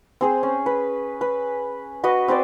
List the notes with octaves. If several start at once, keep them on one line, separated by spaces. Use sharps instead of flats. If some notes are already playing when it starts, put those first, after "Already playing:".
C4 G#4 C5
C#4
B4
B4
F#4 B4 D#5
C4 B4 C5 D5